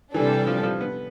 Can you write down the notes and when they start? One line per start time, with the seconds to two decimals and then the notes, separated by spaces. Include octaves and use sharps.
0.14 C3 E3 G3 D4 A4
0.47 F3
0.63 F3
0.81 B3